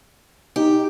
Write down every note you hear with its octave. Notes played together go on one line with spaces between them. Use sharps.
D#4 G4